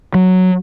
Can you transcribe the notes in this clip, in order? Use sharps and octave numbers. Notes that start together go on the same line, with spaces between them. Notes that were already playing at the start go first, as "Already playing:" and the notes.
F#3